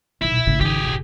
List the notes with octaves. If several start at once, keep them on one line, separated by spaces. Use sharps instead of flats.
D#1 B1 E4
G#1 A2 C#3
D#3 G4 G#4
D#1